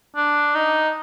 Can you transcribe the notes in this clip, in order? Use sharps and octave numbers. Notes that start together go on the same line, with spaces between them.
D4
D#4